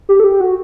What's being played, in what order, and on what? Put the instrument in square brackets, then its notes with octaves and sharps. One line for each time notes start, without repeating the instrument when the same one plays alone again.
[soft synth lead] G4
A4
G4
F#4